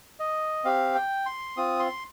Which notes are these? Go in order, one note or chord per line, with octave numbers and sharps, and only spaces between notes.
D#5
C4 G4 F5
G5
C6
C4 F4 D#6
C6